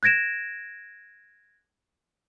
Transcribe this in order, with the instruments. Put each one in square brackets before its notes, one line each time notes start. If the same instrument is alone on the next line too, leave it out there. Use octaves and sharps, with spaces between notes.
[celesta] F#6 G#6 A#6 D7 E7